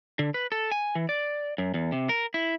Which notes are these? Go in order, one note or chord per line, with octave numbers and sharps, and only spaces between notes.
D3
B4
A4
G#5
E3
D5
F#2
E2
C3
A#4
E4